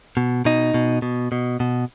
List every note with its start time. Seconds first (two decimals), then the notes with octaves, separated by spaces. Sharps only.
0.17 B2
0.45 B2 D#4
0.74 B2
1.02 B2
1.32 B2
1.60 B2